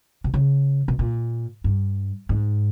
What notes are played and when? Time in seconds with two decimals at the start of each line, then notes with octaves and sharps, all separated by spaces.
0.24 B2
0.34 C#3
0.88 B2
0.99 A#2
1.64 G2
2.29 G#2